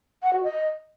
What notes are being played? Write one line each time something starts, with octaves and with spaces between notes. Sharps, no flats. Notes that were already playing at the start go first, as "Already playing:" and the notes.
F#5
F#4
D#5